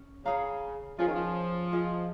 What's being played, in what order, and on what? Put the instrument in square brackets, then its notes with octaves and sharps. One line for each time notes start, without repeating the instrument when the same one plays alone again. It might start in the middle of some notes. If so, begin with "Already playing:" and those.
Already playing: [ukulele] C#4
[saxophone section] C#3 [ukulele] G#4 C#5 F5 A#5
[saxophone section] F3 [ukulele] C#4 F4 G#4
[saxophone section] D#3
F3
[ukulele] F4 G#4 D#5